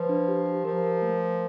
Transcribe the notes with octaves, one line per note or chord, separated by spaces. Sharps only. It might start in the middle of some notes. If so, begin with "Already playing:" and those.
Already playing: F3 B4
D4
G4
G4
F3 A#4
A#4
A3
A#4